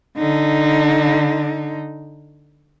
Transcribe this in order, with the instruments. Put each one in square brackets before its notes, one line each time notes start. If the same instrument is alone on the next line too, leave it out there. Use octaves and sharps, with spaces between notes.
[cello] D3 D#4